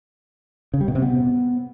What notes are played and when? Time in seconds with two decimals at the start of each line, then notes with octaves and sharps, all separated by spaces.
0.74 C#3
0.81 G3
0.88 B2
0.95 C3
1.02 B3